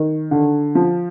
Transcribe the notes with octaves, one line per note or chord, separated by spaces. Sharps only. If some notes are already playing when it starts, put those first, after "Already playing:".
Already playing: D#3
D3
F3